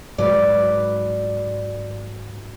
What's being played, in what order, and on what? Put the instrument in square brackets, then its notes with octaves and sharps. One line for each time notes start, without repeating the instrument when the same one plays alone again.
[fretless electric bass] G#2 F#3 [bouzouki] B4 D5